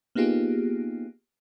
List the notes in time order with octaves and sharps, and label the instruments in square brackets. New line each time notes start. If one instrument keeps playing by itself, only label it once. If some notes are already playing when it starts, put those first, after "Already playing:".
[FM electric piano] A#3 B3 D#4 F4 G4 G#4